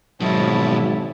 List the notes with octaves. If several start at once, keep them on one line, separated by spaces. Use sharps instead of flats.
G#1 B2 F3 F#3 E4 C#5 A5